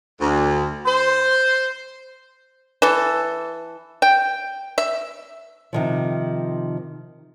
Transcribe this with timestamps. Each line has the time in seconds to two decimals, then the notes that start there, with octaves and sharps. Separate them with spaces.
0.21 D2
0.86 C5
2.82 E3 A4
4.02 G5
4.78 E5
5.73 C3 D#3 F3